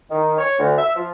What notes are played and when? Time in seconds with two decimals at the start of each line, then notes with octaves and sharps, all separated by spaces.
0.10 D#3
0.38 C#5
0.59 D2
0.78 E5
0.95 F3